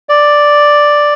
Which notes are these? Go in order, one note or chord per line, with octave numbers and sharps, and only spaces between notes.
D5